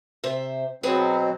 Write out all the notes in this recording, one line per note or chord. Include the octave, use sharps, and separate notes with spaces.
C3 C5 E5
B2 F#3 C4 G#4 B4 C5